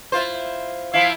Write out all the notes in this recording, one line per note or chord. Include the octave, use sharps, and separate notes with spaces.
E4 F4 C5
F3 E4 F5